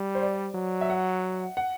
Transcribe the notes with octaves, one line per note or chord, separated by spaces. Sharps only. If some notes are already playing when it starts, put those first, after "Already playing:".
Already playing: G3
C5
D5
F#3
E5
F#5
F#5